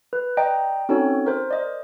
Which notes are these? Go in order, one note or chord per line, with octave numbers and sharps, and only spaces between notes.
B4
D5 D#5 G5 A#5
C4 C#4 D#4 F#4 A4 C#5
A#4 C5
D5 D#5